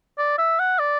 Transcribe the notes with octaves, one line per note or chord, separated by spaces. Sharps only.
D5
E5
F#5
D5